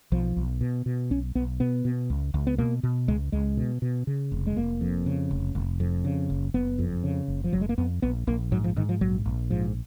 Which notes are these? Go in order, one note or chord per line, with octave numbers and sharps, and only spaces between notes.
B1 F3
B1
B2
B2
B1 C#4
B1 B3
B2 B3
B2
C#2
C#2
B3
B2 A#3
B2
C#2 G#3
C#2 G#3
B2
B2
C#3
F1
G#3
F1 A#3
F2
C#3
F1
F1
F2
C#3
F#1
F#1 B3
F2
C#3
F#1
F3
F#1 F#3
G#3
A#3
F2 B3
A#1 B3
A#1 A#3
G#2 F#3
F3
G#2 D#3
F3
A#1 F#3
A#1
G#2 F3